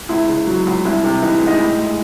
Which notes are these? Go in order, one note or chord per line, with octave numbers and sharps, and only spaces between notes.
C#2 E4
C#3
F#3
C#2
C2 E4
C3
E3 D#4
G#3
D#4
A2
G#3